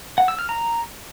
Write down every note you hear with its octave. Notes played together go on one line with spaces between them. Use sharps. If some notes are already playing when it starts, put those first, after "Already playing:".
F#5
E6
F6
A#5